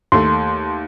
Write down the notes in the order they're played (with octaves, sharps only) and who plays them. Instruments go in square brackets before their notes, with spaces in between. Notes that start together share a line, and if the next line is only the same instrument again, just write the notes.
[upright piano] D#2 A3 [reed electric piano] C6